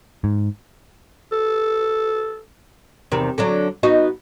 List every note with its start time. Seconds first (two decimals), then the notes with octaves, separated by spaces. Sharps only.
0.24 G#2
1.32 A4
3.12 E2 C3 D#3
3.38 D3 F#3 D4
3.83 B3 D#4 F#4